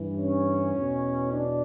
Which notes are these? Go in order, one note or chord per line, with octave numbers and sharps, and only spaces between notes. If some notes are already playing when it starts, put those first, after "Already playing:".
Already playing: G2 E3
C#4
E2 B2
D4